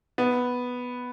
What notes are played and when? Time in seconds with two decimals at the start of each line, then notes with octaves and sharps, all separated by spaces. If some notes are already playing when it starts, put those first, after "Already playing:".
0.18 B3